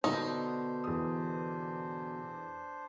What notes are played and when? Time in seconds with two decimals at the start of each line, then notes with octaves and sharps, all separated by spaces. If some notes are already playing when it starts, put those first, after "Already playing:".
0.04 B2 D3 D4 D#4 C5
0.84 E2 D#6